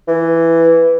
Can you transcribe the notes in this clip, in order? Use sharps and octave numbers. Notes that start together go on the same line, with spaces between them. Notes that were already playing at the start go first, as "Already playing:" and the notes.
E3